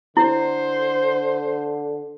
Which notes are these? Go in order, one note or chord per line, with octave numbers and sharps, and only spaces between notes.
D3 E4 C5